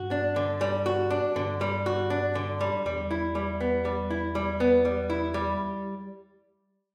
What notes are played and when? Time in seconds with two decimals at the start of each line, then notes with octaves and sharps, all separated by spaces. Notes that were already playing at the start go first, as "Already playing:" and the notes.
Already playing: G2 F#4
0.11 D4
0.36 D3
0.61 G3
0.86 F#4
1.10 D4
1.36 G2 D3
1.61 G3
1.86 F#4
2.10 D4
2.35 D3
2.61 G3
2.85 E2 G3
3.11 E4
3.35 G3
3.60 B3
3.85 G3
4.10 E4
4.35 G3
4.60 B3
4.85 G3
5.10 E4
5.34 G3